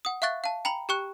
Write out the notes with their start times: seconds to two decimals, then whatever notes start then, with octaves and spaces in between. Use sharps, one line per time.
0.05 F#5 D#6
0.22 E5 F5 C#6 F#6 A6
0.44 F5 A5
0.65 G5 A#5 B5 F#7
0.89 G4 G5 C#6 F#6